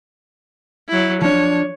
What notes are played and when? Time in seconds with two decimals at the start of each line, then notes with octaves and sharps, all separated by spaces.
0.89 F#3 E4
1.22 F3 D4 C#5